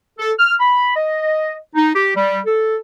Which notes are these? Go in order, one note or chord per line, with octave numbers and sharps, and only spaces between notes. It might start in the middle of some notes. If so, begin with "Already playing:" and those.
A4
F6
B5
D#5
D#4
G4
G3
A4